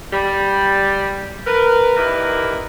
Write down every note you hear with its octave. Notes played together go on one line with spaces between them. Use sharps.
G3
A#4 B4
G2 D#3 A#3 E4 B4